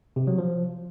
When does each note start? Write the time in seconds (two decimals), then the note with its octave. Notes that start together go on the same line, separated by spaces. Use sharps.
0.16 C3
0.27 F#3
0.38 F3